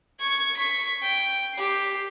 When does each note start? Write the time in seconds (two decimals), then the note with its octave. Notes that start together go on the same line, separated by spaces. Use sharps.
0.20 C#6 G#6
0.57 C#6 B6
1.02 G5
1.55 G4 C7